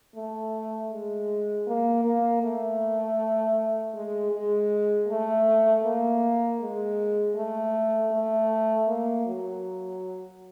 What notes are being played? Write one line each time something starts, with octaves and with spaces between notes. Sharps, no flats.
A3
G#3
A#3
A#3
A3
G#3
G#3
A3
A#3
G#3
A3
A3
A#3
F#3